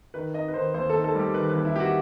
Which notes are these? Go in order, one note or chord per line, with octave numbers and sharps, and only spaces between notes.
D#3 B4
D#4 D#5
B4
D#3 C5
D#2 C5
A4
D#3
A4
G3 G4
D#3 B4
B4
D#2
E4
D#3 G4
F#4